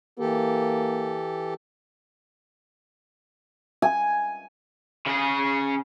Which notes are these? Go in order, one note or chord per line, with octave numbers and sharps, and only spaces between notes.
E3 A#3 G4 A4
G#5
C#3 G#4